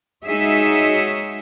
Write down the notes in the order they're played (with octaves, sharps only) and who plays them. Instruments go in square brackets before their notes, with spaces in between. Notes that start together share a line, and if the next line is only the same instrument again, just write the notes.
[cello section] G#3 D#4 F#4 G#4 C#5 E5